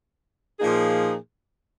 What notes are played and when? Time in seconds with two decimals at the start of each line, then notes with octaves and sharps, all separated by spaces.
0.60 A#2 F3 A#3 D#4 G#4